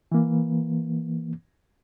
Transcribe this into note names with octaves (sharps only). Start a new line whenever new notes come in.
E3 A#3